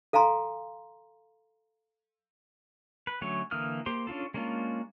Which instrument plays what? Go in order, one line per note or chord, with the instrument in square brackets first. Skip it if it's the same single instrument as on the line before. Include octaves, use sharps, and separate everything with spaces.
[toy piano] A4 F5 G#5 A#5 C6
[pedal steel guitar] B4
D3 F#3 A3 C#4 C#5
D3 E3 A#3 D#6 F6
A#3 G4 C5 C6
C#4 D4 F4 A4
G#3 A#3 C#4 D4 F4